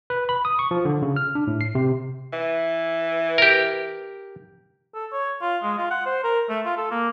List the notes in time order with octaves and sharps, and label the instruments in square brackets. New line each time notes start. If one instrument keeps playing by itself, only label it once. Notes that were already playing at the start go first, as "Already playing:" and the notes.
[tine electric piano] B4
B5
D#6
C#6
F3
D3
C#3
F6
D4
A2
C7
C3
[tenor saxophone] E3
[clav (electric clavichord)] G4 A#4
[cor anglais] A4
C#5
F4
G#3
F4
F#5
C5
A#4
A3
F4
A4
A#3